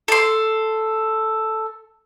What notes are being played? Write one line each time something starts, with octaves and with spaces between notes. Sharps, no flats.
A4 C6